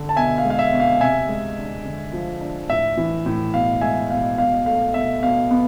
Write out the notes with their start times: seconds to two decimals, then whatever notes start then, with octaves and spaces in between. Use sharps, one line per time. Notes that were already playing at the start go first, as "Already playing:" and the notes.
Already playing: D3
0.09 A5
0.16 B2 E5 G#5
0.38 F5
0.45 G#3
0.50 F5
0.59 E5
0.72 B2
0.80 F5
1.01 C3 E5 G#5
1.29 G#3
1.57 D4
1.85 D3
2.13 F3
2.41 D4
2.70 A2 E5
2.97 E3
3.26 A2
3.54 B2 F5
3.81 G#3 E5 G#5
4.10 B2 F5
4.38 B2 F5
4.66 A3 F5
4.94 B2 E5
5.22 B2 F5
5.51 B3